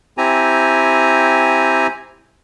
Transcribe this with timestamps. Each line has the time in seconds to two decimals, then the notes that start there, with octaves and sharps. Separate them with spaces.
0.18 C4 E4 G4 G#5 A#5